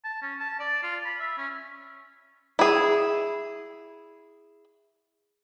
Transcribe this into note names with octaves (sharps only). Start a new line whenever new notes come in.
A5
C#4
A5
D5
F4
B5
E5
C#4
E4 G#4